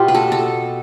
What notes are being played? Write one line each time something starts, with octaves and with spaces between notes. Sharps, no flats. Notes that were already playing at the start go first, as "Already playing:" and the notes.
Already playing: B2 B3 F4 G4
B4
A4
A4